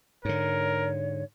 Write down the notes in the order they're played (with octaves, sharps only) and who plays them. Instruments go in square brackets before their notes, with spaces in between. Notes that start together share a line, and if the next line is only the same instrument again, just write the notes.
[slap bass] G#2 D3 [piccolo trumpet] A#4 [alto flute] C#5